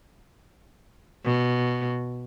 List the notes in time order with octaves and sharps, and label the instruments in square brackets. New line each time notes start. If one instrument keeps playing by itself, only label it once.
[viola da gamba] B2